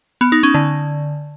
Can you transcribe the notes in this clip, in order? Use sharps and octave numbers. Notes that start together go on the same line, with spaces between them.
B3
D#4
C#4
D3